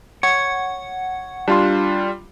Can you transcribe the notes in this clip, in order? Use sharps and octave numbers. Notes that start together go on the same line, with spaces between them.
C#5 F#5
G3 D4 F4 C6